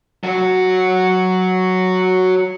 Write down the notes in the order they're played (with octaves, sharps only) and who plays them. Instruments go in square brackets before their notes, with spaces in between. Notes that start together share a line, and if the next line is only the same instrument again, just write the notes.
[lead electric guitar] F#3 F#4